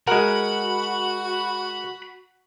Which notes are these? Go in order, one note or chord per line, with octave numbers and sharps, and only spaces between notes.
G#3 F#4 A#4 F#5 B5